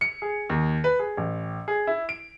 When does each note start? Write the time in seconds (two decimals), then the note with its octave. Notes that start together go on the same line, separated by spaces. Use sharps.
0.01 C#7
0.22 G#4
0.49 D#2
0.84 B4
0.99 G#4
1.17 A1
1.68 G#4
1.87 E4
2.09 D7